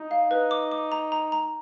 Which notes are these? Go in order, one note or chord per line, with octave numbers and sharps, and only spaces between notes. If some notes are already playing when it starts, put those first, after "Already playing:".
Already playing: D#4
F5
D#4 B4
D6
D6
A#5
A#5
A#5